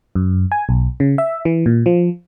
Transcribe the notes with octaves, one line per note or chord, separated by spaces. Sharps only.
F#2
G#5
B1
C#3
E5
E3
A#2
F3